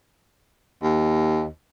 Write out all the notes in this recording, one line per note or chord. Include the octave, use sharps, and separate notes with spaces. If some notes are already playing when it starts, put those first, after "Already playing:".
D#2